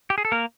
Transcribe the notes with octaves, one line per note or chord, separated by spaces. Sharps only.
G4
G#4
A4
A#3 A#4